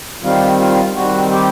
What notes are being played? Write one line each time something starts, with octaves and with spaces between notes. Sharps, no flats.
D#3 G3 C4 F4
F4
D#3 G3 C4 F#4
G4